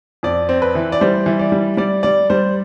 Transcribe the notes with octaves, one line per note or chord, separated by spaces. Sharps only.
F2 D5
C4
B4
E3
D5
G3 C5
E3
D5
G3
G3 D5
G3 D5
G3 C5